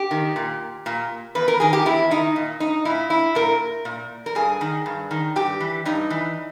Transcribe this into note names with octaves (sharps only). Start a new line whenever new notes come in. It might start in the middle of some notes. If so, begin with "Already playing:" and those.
Already playing: G4
D#3
A#2
A#2
E2 B4
A#4
D#3 G#4
G4
E2 E4
D#3 D#4
A#2
D#4
A#2 E4
E4
A#2 A#4
A#2
A#4
G2 G#4
D#3
G2
D#3
G2 G4
E3
G2 D#4
E3